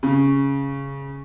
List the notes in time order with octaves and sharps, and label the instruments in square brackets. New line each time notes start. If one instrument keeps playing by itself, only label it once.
[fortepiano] C#3